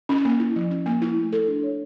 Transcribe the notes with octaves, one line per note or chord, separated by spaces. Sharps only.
C#4
A#3
E4
F3
C#4
A#3
E4
A3
A4
D4
C#5